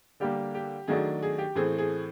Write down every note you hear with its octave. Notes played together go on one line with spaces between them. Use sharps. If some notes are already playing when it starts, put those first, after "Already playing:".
D3 G3 A#3 G4
G4
D#3 F#3 A3 D4 G#4
G#4
G4
A2 E3 A3 C4 G#4
G#4